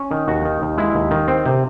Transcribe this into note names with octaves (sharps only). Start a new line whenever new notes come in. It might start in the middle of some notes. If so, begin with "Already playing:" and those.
Already playing: C#4
D#3
D#2 F#4
D#3
D#2
G#3 E4
D#2
D#3
C4
C3